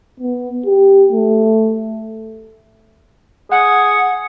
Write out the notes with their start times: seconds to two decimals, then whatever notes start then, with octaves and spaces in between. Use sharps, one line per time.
0.20 B3
0.66 G4
1.12 A3
3.51 G#4 F#5